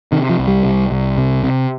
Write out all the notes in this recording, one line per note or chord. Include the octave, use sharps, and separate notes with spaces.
C3 D#3
F3
C2
G3
C2
C2
C3
C3